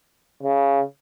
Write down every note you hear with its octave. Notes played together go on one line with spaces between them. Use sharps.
C#3